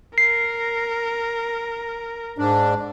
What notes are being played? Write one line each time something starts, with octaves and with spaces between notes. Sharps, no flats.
A#4 C7
G#2 D4